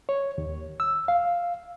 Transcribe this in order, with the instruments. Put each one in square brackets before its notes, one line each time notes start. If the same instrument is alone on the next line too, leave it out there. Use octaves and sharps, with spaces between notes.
[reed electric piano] C#5
D#2
E6
F5